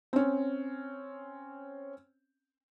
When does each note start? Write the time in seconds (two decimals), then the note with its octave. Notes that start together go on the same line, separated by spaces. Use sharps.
0.13 C4 C#4